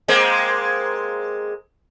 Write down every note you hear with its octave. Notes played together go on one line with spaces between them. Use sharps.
G#3 A#3 C4